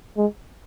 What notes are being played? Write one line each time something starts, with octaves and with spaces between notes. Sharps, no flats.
G#3